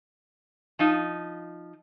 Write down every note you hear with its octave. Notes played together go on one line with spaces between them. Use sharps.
F3 D#4